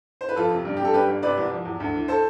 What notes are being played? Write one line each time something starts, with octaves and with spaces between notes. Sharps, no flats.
C5
B4
F2 F4 A4
C3
G2
G2 G4
A4
G2 G4 B4
G1
C3 B4 D5
C2
F3
E2
D2
E3
A4 C5